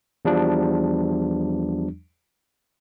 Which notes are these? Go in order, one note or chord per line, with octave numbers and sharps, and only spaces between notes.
E2 F3 G3 D4